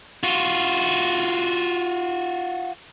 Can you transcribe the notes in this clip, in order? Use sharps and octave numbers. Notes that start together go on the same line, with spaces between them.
F4 F#4